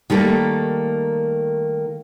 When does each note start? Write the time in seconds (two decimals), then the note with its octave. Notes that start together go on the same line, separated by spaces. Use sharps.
0.10 D#3 G3 A3 A#3